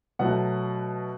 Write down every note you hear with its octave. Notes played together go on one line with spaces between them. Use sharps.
B2 F#3 A3 F#5